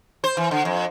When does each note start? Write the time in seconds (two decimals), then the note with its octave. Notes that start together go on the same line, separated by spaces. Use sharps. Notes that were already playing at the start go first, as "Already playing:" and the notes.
0.24 C5
0.37 E3
0.51 D3
0.65 F2